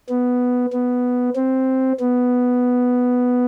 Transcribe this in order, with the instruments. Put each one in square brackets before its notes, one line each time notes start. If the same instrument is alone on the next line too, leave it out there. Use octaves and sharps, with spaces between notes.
[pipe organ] B3
B3
C4
B3